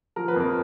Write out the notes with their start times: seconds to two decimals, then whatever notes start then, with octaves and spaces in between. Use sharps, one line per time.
0.16 F3 A#4
0.28 B4
0.36 F2 A#4